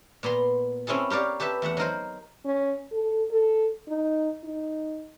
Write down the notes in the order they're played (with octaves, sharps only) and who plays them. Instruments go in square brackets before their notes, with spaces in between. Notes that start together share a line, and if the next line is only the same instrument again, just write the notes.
[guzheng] A#2 B3 A#5 C6
C4 C#4 E4 G#4 A4
G4 A#4 C#5 D5 F5
G4 A4 B4 E5
E2 A3 E5 F#5
F#3 D#4 A#4 C5
[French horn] C#4
A4
A4
D#4
D#4